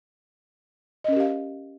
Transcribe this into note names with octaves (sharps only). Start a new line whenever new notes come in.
C#4 G4 A#4 D#5 F5